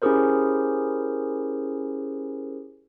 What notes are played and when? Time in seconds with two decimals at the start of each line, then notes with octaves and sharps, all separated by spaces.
0.02 C#4 E4 G4 G#4 A#4 C5